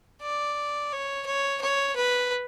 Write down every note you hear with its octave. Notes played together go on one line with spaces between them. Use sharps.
D5
C#5
C#5
C#5
B4